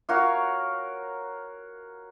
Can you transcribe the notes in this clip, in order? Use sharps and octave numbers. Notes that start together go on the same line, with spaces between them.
F#4 A#4 C#5 F5